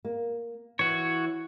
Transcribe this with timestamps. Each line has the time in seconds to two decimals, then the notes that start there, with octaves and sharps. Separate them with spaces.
0.05 A#3
0.79 E3 F#4 C#5